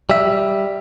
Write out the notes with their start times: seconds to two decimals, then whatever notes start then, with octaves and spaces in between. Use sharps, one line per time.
0.10 G3 E5